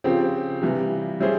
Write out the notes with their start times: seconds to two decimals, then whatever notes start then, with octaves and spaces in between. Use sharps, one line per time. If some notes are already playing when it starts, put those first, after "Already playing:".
0.04 C#3 F3 C4 G4
0.62 C3 E3 G3
1.21 G3 C#4 E4 G#4 C5